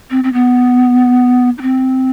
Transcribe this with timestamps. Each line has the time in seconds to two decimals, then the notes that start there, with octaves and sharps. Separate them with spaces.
0.11 C4
0.24 C4
0.33 B3
1.58 D#4
1.62 C4